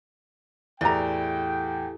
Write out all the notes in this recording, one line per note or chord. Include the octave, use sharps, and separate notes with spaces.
E2 A2 E4 G4 A4 D5 G5 A#5